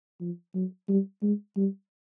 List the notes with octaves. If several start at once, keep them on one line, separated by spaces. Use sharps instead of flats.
F3
F#3
G3
G#3
G3